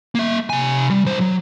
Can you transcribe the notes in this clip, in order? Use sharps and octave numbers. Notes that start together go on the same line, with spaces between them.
A#3 E5
C3 G#5
G3
B1 C5
F#3